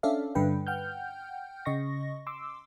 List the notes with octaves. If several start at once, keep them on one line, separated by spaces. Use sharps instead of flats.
C#4 D4 A4 D5 E5 F5
G2 D3 B4 G5
F#5 G5 F6 G6
C#3 D#5 C#6 A#6
C6 D6 E6